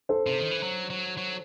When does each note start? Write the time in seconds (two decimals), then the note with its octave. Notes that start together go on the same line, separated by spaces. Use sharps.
0.09 A4 C5
0.27 C3
0.39 D#3
0.51 E3
0.63 F#3
0.90 F#3
1.17 F#3